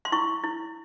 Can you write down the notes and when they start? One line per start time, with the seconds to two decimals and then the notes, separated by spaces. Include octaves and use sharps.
0.05 C6
0.12 E4 C#6
0.44 E4